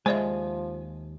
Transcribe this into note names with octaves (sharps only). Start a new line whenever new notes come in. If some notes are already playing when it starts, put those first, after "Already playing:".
D#2 F3 G#3 C5 D5 E5 G#5